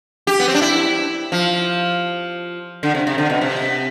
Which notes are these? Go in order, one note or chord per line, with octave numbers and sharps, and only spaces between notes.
G4
B3
C4
D4
E4
F3
D3
C3
C3
D3
B2
C3